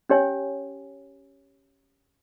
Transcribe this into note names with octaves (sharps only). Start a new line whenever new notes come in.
C#4 G4 C#5 G#5